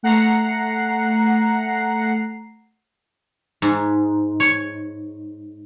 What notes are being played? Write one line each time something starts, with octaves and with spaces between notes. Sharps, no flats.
A3 F#5 A#5 C7
G#2
C#5